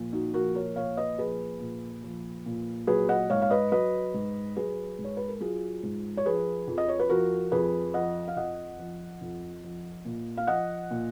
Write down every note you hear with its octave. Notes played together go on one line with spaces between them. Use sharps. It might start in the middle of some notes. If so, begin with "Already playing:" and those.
Already playing: A#2 F3
D#4 F#4
F3 F#4 A#4
A#4 C#5
A#2 C#5 F5
B4 D#5
F3 G#4 B4
A#2
F3
A#2
F#3 G#4 B4
D#5 F#5
G#2 C#5 F5
F5
B4 D#5
F#3 B4 D#5
G#2
F#3 G#4 B4
G#2
C#5
B4
A#4
F#3 F4 G#4
G#2
C#5
F3 G#4 B4
F2
D#5
C#5
B4
F3 F#4 A#4
F2 G#4 B4
F3 D#5 F#5
F5
F2 D#5 F#5
F3
F2
F3
A#2
F5
F3 D#5 F#5
A#2